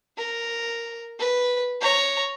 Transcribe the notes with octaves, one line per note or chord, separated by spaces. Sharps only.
A#4
B4
C#5 A#5